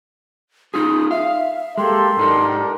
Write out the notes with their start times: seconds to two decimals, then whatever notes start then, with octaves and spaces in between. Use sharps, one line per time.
0.74 D#4 F4 G#4 D#6
1.11 E5 F5
1.78 G#3 A#3 G4 A4 C6
2.17 G#2 D4 D#4 G4 A4 A#4